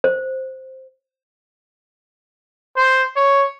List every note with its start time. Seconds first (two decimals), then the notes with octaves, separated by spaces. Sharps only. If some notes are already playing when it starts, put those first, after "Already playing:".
0.04 C5
2.77 C5
3.16 C#5